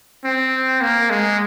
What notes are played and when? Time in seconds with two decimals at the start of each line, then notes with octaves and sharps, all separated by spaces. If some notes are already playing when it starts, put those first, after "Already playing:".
0.24 C4
0.81 A#3
1.10 G#3